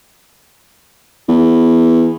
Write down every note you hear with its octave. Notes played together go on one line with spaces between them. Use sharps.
E2